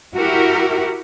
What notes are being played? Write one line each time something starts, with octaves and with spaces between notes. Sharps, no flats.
E4 F#4 G4 A#4